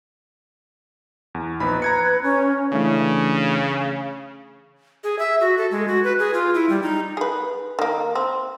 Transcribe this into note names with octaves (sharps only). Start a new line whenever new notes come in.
E2
A#1 D#4 B4 B5
A#5 G#6 C#7
C#4
C#3 E3 A3 D4
G#4
E5
F#4
A4
G#3
F#4
B4
G#4
F4
E4
G3
D#4
G#4 B4
D#3 A#3
C4